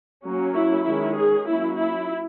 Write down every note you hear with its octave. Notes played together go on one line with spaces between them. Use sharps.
F#3 A#3 C#4
E4
D#3 G#3 C#4 E4
G#4
F#3 A#3 C#4 E4
E4